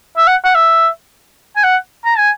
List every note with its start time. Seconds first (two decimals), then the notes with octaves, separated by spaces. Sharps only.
0.17 E5
0.28 F#5
0.44 F#5
0.55 E5
1.56 G#5
1.64 F#5
2.05 A#5
2.18 G#5